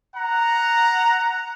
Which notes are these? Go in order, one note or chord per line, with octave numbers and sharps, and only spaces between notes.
F#5 A#5